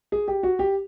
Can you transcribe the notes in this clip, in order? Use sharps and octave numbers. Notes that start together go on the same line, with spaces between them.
G#4
G4
F#4
G4